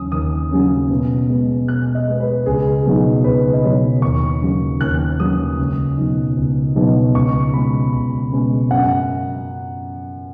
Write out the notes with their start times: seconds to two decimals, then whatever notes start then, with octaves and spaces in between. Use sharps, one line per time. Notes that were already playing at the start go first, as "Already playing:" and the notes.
Already playing: D#2 C#3 F#3 C#4 D#6
0.12 D#2 D#6
0.51 C#3 F#3 C#4
0.90 B2
1.29 G#3 B3
1.68 B2 F#6
1.95 D#5
2.08 G#3 B3
2.20 B4
2.46 C#2 G#4
2.86 B2 F#3 D#4
3.24 C#2 B4
3.53 D#5
3.63 B2 F#3 D#4 C#5
4.02 D#2 C#6
4.42 C#3 F#3
4.81 D#2 F#6
5.20 C#3 F#3 D#6
5.59 C#2
5.97 B2 F#3 D#4
6.37 C#2
6.76 B2 F#3 D#4
7.15 C#2 C#6
7.54 B2 G#3 C#4 B5
7.93 C#2 B5
8.32 B2 G#3 C#4
8.70 F#2 F#5